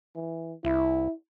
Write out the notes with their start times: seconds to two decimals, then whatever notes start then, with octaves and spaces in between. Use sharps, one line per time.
0.16 E3
0.65 C2 E4